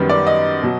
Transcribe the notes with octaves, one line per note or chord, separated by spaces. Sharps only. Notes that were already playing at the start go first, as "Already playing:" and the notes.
Already playing: F#2 D#3 G3 B3
D5
D#5
B2 F#3